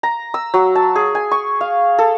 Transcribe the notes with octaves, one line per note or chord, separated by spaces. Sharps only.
A#5
E6
F#3
A5
G#4
G#5
C#6
F5
A4